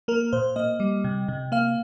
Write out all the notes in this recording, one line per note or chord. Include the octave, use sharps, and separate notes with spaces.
A#3 A#4
A#2 C5
A#3 D#5
G3
C3
C3
A#3 F5